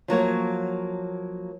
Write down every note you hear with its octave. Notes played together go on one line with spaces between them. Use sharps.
F3 F#3 A#3 C#5